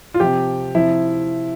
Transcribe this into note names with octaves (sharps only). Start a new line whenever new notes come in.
F4
C3 F3 G4
C3 F3 E4